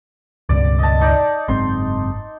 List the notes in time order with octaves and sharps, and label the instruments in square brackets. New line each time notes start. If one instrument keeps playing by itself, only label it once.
[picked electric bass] C#2 G2 B2 [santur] D5
[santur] D#5 A5
D#4 D5
[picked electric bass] F#1 G#2 C4 [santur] C6